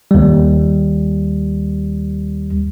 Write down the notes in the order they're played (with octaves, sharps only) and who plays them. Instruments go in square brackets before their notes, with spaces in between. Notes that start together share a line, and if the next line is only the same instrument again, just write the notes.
[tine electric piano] D#2 G3